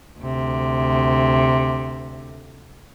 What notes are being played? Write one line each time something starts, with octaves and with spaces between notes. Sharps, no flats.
D2 C3